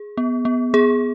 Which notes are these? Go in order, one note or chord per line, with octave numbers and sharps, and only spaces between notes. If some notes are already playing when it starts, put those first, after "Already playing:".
Already playing: G#4
B3
B3
B3 G#4